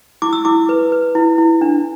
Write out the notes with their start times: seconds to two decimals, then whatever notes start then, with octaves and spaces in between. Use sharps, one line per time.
0.22 E4 D6
0.33 E6
0.45 E4 D6
0.69 B4
0.92 B4
1.15 E4
1.38 E4
1.61 D4